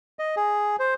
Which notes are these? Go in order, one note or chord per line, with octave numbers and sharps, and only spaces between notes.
D#5
G#4
C5